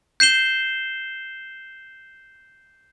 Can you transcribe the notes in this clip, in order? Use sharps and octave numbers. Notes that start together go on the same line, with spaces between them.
G6 C7 E7 G7